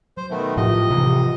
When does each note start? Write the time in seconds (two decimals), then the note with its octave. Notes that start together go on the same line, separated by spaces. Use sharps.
0.17 F#3 C5
0.30 B2 D#3 A3
0.57 A2 F3 G4 D#5
0.90 C3 D#3 E3